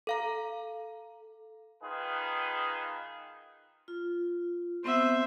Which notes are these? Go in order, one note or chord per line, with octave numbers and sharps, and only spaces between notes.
A4 F5 A#5
D#3 F4 G#4 B4
F4
B3 C4 C5 E5 F#5